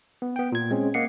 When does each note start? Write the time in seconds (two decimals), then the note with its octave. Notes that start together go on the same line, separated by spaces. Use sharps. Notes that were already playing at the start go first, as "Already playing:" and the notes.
0.22 B3
0.36 B3 G5
0.52 A#2 G#6
0.71 G#3 C4 C#4
0.94 A#3 D#5 F#5 C7 C#7